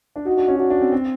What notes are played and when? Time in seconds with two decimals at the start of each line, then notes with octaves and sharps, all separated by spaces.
0.16 D4
0.26 D#4 F#4
0.37 D4
0.48 C#4
0.59 D4 F#4
0.70 D4
0.77 C#4
0.82 C4
0.92 C4